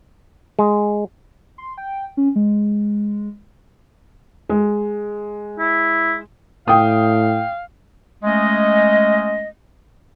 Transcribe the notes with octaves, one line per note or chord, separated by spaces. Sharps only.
G#3
C6
G5
C#4
G#3
G#3
E4
A2 F5 G5 D#6
G#3 A3 C#4 D#5